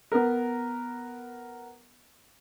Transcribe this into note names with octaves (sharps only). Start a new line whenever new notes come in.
B3 A#4